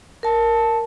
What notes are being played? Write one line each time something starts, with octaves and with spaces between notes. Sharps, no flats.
A#4 A5